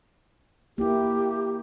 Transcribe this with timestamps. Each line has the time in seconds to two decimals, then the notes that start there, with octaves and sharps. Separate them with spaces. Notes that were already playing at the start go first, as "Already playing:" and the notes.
0.78 A#3 E4 G4